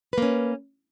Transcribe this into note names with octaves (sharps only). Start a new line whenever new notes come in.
A#3 C#4 B4